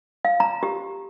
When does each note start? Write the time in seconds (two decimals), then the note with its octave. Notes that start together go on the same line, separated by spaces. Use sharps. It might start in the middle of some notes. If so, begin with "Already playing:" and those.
0.25 F5
0.40 A#5
0.63 G4